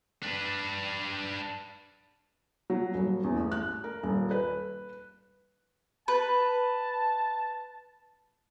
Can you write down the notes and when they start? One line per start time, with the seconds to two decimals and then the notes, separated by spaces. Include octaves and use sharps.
0.23 D4 B4
2.70 F#3
2.94 D#1
3.24 E2
3.36 A1
3.52 F#6
3.84 A#4
4.03 D#1
4.31 B4
6.08 B4 A5